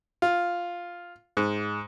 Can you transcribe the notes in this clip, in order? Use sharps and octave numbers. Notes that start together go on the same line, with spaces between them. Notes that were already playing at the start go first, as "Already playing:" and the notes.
F4
G#2